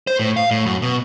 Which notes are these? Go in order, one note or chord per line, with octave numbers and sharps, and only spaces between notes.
C5
A2
F5
A2
F#2
B2